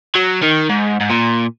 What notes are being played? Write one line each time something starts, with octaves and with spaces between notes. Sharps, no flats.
F#3
D#3
G#2
G#2
A#2